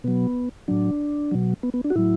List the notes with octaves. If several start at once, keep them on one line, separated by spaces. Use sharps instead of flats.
B2 F#3 B3
A2 F#3 D4
B2 F#3
B3
B3
D4
F#4
A2 F#3 E4